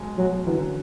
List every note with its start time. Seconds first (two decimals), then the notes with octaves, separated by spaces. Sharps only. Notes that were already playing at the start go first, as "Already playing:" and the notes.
Already playing: B1 B2 G#3
0.17 B1 B2 F#3 G#3
0.46 F#2 D3 E3 F#3